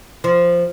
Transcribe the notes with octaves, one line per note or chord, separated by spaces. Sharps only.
F3